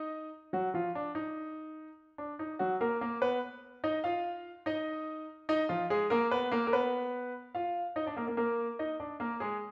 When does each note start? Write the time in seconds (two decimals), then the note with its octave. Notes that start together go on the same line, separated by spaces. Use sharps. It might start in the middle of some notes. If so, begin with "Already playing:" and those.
Already playing: D#4 D#5
0.53 F#3 F#4
0.74 F3 F4
0.95 D4
1.15 D#4
2.18 D4
2.39 D#4
2.59 F#3 F#4
2.81 A#3 A#4
3.01 A#3 A#4
3.22 B3 B4
3.84 D#4 D#5
4.04 F4 F5
4.66 D#4 D#5
5.49 D#4 D#5
5.69 F3 F4
5.90 G#3 G#4
6.10 A#3 A#4
6.31 B3 B4
6.52 A#3 A#4
6.67 A#4
6.73 B3 B4
7.55 F4 F5
7.96 D#4 D#5
8.06 D4 D5
8.17 A#3 A#4
8.27 A#3 A#4
8.37 A#3 A#4
8.79 D#4 D#5
9.00 D4 D5
9.20 A#3 A#4
9.40 G#3 G#4